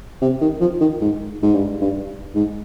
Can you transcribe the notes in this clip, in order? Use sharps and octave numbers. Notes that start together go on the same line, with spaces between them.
C3
D#3
F3
D#3
G#2
G#2
G2
G2
G#2